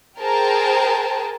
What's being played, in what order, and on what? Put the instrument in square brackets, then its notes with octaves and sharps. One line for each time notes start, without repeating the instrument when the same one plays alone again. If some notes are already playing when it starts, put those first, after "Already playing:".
[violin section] G#4 A#4 C5 G5 A5